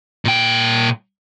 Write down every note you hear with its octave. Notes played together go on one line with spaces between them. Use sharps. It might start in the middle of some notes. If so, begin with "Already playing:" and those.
A#2 G5